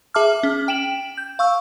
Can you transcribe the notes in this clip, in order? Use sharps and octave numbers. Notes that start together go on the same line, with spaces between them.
G#4 E5 A5 D6 F6
C#4
G5 D7 E7 F#7
G6
F5 C#6 E6